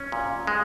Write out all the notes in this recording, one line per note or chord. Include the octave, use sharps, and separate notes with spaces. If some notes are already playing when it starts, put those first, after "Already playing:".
Already playing: C#4
A#2
G#3